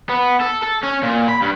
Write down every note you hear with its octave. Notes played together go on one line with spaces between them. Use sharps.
B3
A4
A4
C#4
A#2
B5
G2